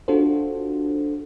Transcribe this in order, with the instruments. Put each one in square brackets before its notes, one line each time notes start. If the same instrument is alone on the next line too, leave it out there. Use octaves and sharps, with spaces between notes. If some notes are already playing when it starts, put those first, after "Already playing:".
[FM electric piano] D4 F4 F#4 A4 C5